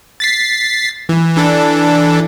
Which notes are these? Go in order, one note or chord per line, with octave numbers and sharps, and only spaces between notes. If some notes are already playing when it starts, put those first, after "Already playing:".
A6 B6 C7
E3
E3 D4 A4